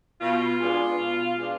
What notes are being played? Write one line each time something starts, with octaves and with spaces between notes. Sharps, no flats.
B2 F4
G#3 B3 D4
B2
G#3 B3 D4